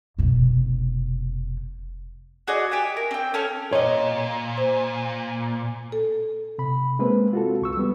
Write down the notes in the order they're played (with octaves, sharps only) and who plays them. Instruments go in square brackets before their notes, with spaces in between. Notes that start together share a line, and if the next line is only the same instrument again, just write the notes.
[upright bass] F1 B2
[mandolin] F#4 G#4 D5 D#5
G4 E5 G#5
A#4
C4 G5
C#4 A4 G#5 F6
[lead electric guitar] A#2 [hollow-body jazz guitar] C#5 D#5
[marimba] C5
A4
[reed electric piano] C3 B5
G#3 A#3 C4 B4
F4 F#4 A4
C#2 C#6 E6
G3 B3